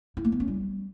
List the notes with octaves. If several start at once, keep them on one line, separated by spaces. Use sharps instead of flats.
E4
A#3
B3
C#4
G3